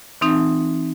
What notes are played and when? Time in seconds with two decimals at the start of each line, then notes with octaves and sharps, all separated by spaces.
0.21 E3 C4 D#4